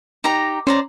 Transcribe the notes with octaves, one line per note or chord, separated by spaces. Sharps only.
D#4 G4 A#5 A#6
C#4 C5 D5 A#5